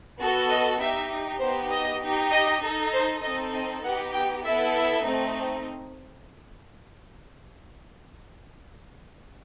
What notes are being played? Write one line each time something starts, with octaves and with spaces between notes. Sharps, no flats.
B3 F#4 A4
D#5
D#4 G4 E5
B3 D#4 G4 C5
D#5
D#4 G4
D#5
D#4 A4
C5
C4 D#4 A4 D#5
D#5
B3 D#4 G4 F#5
G5
B3 E4 A4 E5
E5
A3 C4 D#4